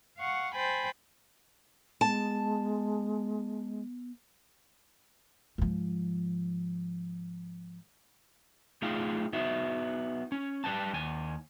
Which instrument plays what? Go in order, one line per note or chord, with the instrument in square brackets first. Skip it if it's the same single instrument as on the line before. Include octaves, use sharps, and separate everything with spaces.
[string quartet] F5 F#5 C#6
C5 G5 G#5 B5 G6 A6
[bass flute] G#3 [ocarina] B3 [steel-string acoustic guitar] A5
[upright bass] G#2 F3
[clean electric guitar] A3 D#4 F4 G#4 F5 G5
B3 D#4 F#4 E5
C#4
G3 B4 G5 A5
D#2 G#5